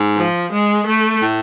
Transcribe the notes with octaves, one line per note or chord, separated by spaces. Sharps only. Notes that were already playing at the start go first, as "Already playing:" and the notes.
Already playing: G#2
F3
G#3
A3
A2